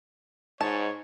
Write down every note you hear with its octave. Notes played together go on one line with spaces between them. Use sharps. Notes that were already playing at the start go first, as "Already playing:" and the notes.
G#2 D#4 C#5 A5